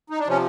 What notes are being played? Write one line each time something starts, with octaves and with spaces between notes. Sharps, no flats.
D#4
D4
C3 F3 C#4